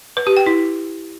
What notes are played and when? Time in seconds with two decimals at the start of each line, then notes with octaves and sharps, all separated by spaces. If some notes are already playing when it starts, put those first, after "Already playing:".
0.17 B4
0.27 G4
0.37 G5
0.46 E4